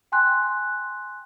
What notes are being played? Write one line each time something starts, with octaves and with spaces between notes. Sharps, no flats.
G5 G#5 C6 F#6